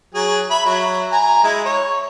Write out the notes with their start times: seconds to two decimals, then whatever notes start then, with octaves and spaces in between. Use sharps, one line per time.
0.14 F#3 G#4
0.50 E5 B5
0.66 F#3 E5
1.12 G#5 A#5
1.44 G#3 E4
1.65 C#5